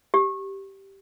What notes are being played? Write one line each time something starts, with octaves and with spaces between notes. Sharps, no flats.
G4